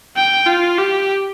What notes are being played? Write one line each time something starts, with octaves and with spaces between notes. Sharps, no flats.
G5
F4
G4